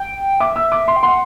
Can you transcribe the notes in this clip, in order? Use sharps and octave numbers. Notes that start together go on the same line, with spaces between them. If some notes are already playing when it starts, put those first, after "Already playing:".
Already playing: G5
E5 D6
E6
D6
C6
G5
F#5 C6